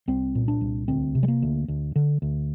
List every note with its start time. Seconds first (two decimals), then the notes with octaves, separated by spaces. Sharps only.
0.08 C2 C4
0.35 A#2
0.48 D4
0.61 C2
0.88 D2 C4
1.15 C3
1.23 G3
1.28 A#3
1.42 D2
1.68 D2
1.96 D3
2.22 D2